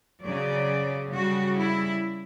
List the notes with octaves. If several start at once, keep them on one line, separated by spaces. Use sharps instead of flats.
C#3 F#3 D5
C#3 G3 F#4
E4